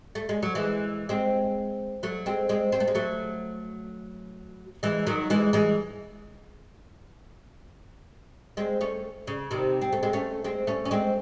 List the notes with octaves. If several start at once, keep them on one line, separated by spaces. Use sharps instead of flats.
A3
G#3
F#3
E3 G#3
G#3 C4
F#3 A3
G#3 C4
G#3 C4
C4
A3
G#3
F#3 A3
E3 G#3
D#3 F#3
E3 G#3
E3 G#3
G#3 C4
A3 C#4
C#3
C3 D#3
C4
A3
G#3 C4
A3 C#4
G#3 C4
A3 C#4
C#4
G#3 C4